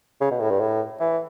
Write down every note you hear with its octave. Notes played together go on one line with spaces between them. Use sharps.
C#3
B2
A2
G2
A2
E3